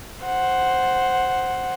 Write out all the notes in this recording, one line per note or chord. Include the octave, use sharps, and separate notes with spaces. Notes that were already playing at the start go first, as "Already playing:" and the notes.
C5 F#5